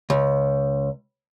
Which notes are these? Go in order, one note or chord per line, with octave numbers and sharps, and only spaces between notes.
C#2